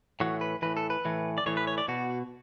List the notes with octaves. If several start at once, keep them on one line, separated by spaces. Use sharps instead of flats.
A2 E3 F#4
B4
A2 E3 B4
A4
B4
A2 E3
D5
A2 E3 C#5
B4
C#5
D5
B2 F#4